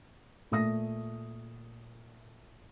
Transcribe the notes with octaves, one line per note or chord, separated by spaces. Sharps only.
A#2 A3 D#6 A#6